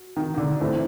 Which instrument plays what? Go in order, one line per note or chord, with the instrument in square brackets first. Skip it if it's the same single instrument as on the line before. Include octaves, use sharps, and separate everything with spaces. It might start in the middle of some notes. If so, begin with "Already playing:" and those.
Already playing: [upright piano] F#4
[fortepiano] D#3
D#3
D3
[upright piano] A2 E3 A3 C4